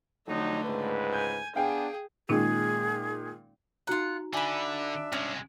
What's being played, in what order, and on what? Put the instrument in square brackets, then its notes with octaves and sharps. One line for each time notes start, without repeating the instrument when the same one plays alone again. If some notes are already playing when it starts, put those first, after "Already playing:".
[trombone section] F2 F#3 D#4 [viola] D3 A3
[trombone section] C#2 G#2 B4
[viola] G#5 [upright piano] G6
[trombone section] B3 D4 [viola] G#4 [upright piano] F5 G5 G#5
[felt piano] A#2 D#3 G#3 [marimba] C#4 D#4 F4 [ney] G#4
[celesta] D#4 F#4 A#5 [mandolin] F4 F#5
[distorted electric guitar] D3 [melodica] D4 E5 [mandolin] G#5 B5
[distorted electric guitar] C2 G#3 [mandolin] C#4